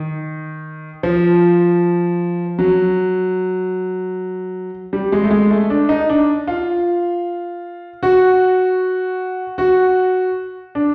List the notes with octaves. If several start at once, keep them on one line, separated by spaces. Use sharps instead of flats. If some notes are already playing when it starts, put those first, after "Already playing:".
Already playing: D#3
F3
F#3
G3
G#3
A3
G#3
A3
D4
D#4
D4
F4
F#4
F#4
D4